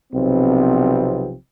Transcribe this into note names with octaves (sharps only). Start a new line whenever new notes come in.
B1 C3 F3 B3 C4